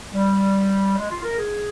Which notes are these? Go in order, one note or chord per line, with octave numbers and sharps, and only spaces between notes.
G3
G#3
F4
A#4
G#4